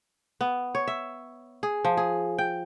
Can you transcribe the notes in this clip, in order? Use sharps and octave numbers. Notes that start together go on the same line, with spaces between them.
B3
C#5
E5
G#4
F3
G#4
G5